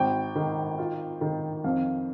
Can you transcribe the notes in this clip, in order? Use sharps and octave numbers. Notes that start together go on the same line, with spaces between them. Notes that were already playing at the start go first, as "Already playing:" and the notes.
Already playing: G#1 G5
D#3
F4
D#3
F2 F5